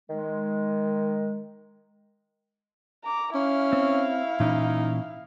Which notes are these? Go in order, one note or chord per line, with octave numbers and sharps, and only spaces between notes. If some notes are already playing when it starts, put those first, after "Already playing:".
D#3 G#3
A#5 D6
C#4 E4 F5
C4
A#2 E3 C#4 D#4